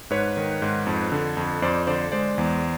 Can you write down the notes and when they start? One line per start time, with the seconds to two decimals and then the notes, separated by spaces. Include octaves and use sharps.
0.10 G#2 B4 C#5
0.37 D#3
0.62 G#2
0.87 F2
1.12 D3
1.37 F2
1.62 F2 C5 D5
1.87 D3 C5 D5
2.12 G#3 C5 D5
2.38 E2